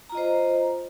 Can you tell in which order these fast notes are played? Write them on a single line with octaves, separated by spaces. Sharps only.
A#5 F4 D#5 C5